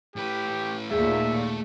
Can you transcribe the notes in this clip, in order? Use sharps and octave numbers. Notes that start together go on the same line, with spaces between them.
A2 G4 B4
D#2 A#2 A3 G#4 E5 G5